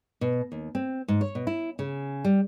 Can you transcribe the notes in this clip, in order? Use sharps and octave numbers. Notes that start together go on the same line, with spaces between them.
B2
D#2
C4
G#2
C#5
B2
E4
C#3
G3